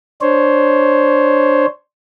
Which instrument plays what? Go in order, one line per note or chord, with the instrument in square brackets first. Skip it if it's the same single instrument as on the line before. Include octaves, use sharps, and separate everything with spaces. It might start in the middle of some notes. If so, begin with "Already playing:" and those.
[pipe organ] D4 C5 C#5